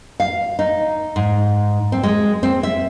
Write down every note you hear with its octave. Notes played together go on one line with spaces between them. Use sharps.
F5
D#4
G#2
C4
G#3
C4
E5